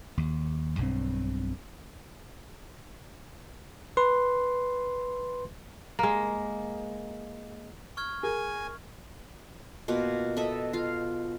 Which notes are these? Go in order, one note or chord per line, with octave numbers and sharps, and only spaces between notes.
D#2
B1 G2 C4
B4 C6
G#3 A#3
C#6 F6 G#6
G#4 A#4 G#5
B2 A#3 F4 B4
A4 D#5 E5 B5
F4 F5